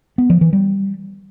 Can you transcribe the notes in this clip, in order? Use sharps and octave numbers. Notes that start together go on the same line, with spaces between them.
B3
F3
E3
G3